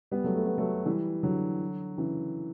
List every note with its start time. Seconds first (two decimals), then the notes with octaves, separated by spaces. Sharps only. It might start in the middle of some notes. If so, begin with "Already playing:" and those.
0.11 G3 B3
0.24 F#3 A3
0.36 A3
0.47 B3
0.58 F#3 A3
0.86 E3 G3
1.23 D3 F#3
1.98 C#3 E3